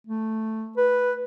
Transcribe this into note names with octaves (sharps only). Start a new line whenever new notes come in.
A3
B4